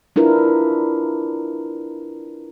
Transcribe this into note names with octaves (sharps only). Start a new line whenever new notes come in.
D4 E4 F4 A#4 B4